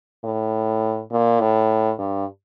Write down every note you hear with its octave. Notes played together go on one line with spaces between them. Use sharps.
A2
A#2
A2
G2